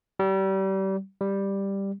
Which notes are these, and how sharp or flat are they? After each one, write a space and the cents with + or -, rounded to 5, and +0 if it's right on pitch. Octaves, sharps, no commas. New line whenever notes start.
G3 -30
G3 +5